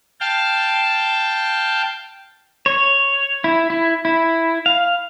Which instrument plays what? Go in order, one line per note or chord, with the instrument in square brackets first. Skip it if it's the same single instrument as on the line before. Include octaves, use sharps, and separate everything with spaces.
[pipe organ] F5 G5 A5
[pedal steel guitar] C#5
E4
E4
E4
F5